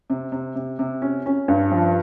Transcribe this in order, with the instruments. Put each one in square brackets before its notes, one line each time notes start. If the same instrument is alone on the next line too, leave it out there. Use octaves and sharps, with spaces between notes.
[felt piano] C3
C3
C3
C3
C#4
C#4
G2
F3